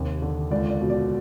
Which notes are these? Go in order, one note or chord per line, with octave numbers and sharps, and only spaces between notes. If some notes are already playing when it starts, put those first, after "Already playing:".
Already playing: D#2 C3
D3
C#2 D5
D5
B2
D5